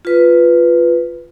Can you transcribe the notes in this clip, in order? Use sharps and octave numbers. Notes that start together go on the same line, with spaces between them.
F4 B4